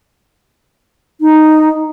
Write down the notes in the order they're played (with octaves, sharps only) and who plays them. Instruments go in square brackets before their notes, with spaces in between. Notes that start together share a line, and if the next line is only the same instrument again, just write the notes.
[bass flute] D#4